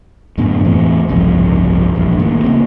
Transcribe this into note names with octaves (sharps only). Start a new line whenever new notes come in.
F#2 A2 D3 B3
E2 A2 E3 C4
F#1 C2 F2 G#2
E1 A#1 G2
D#2 A2
C#3 A#3 C4